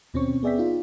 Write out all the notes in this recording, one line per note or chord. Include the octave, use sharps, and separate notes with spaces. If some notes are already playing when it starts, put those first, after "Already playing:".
D#2 B2 C4 C#4 C#6
B3 G#4 D5 E5 G5 B6
D#4 F4